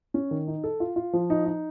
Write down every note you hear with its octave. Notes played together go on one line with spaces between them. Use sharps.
C#4
D#3
D#4
A4
F4
F4
F3
D#4
D#4